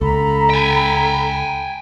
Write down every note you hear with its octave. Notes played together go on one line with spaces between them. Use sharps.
C#2 A4 A#5 B5
G5 G#5